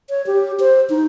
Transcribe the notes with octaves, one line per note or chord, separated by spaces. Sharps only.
C#5
G4
C5
D#4